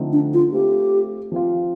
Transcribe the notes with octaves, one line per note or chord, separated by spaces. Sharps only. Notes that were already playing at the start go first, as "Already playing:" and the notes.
Already playing: D3 F3 A3 C4 D#4
D4
F4
A3 C4 F4 G4
F3 C4 F4